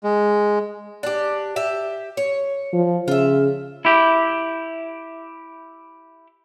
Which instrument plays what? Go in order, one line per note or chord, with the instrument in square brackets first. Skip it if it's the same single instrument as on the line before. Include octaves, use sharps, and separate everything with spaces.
[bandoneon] G#3
[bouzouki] D4 G4
G4 E5
C#5
[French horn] F3
[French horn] C#3 [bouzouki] F4 E5
[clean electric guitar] E4 G4